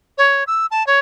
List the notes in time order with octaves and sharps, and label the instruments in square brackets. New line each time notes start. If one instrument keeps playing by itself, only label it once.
[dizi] C#5
E6
A5
C#5